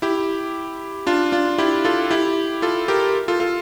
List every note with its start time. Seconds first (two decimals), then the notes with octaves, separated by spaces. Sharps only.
0.02 E4 G4
1.07 D4 F4
1.32 D4 F4
1.58 E4 G4
1.85 F4 A4
2.11 E4 G4
2.62 F4 A4
2.88 G4 A#4
3.28 F4 A4
3.40 F4 A4